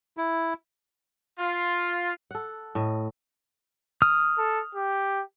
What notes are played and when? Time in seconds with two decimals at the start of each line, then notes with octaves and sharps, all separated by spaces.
0.17 E4
1.39 F4
2.31 A4 F#5
2.75 A2 D#5
4.02 D#6 F6
4.38 A4
4.75 G4